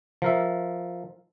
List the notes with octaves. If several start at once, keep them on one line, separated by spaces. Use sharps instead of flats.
F3 A#4 E5